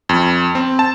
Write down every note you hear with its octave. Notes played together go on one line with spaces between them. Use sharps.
F2
C4
A5